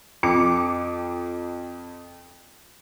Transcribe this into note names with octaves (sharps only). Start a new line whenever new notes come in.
F2 D6 C#7